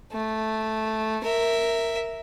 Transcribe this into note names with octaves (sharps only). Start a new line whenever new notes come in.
A3
A#4 E5